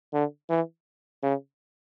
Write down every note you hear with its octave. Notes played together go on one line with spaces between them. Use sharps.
D3
E3
C#3